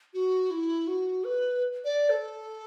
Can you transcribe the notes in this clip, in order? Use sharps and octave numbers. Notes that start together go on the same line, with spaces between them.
F#4
E4
F#4
B4
D5
A4